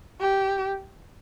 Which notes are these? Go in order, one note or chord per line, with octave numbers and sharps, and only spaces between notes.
G4